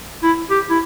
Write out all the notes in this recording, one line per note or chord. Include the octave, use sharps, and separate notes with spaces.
E4
G4
E4